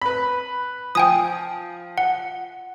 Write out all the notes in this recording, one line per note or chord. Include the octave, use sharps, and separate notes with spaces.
B4 B5
F3 G5 G#5 D#6
F#5